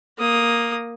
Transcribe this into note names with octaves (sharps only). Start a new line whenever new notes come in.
A#3 D#6